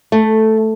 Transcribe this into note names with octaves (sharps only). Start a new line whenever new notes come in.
A3